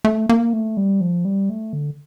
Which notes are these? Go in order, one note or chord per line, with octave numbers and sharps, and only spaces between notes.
A3
A#3
A3
G3
F3
G3
A3
D3